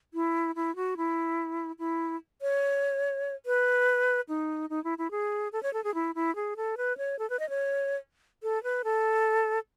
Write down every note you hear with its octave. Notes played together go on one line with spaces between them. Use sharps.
E4
E4
F#4
E4
E4
C#5
B4
D#4
D#4
E4
E4
G#4
A4
C#5
A4
G#4
E4
E4
G#4
A4
B4
C#5
A4
B4
D#5
C#5
A4
B4
A4